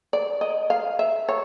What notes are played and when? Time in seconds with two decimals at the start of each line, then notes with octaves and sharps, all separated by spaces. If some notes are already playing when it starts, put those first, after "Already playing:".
0.13 D5
0.41 D#5
0.70 F5
0.99 E5
1.29 C#5